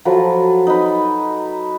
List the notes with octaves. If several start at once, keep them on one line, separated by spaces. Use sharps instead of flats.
F3 F#3 A4 B4
D#4 B4